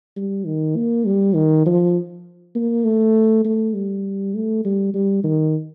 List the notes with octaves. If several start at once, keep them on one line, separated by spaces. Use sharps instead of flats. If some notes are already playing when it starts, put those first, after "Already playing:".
G3
D#3
A#3
G3
D#3
F3
A#3
A3
A3
G3
A3
G3
G3
D#3